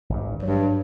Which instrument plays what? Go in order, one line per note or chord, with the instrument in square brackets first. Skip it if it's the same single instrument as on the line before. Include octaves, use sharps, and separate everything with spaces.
[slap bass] G#1 G2
[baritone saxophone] G2 [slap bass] F#3